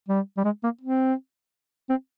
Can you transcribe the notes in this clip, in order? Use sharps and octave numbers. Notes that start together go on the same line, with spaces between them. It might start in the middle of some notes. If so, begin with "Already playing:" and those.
G3
G3
G#3
A#3
C4
C4